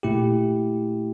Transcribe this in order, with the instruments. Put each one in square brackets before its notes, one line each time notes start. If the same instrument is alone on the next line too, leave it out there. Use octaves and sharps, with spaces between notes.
[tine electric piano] A#2 A3 E4 G4